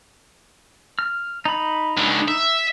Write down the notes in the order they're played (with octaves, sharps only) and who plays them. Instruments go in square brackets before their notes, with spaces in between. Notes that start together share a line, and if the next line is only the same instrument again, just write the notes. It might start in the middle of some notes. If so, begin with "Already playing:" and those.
[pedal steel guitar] F6
D#4 B5
[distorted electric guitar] C#2 D3
E5